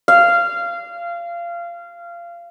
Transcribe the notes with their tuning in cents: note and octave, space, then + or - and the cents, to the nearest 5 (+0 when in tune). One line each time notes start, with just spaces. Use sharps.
F5 -20